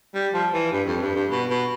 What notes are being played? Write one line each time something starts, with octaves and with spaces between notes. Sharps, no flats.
G3
F3
E3
G2
F2
G2
G2
B2
B2